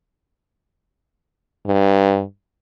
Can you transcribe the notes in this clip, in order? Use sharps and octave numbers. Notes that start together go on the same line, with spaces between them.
G2